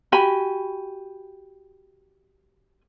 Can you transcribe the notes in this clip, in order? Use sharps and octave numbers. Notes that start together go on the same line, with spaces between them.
F#4 G4 G#5 B5